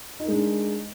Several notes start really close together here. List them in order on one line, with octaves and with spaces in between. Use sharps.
D#4 A#4 G#3 D4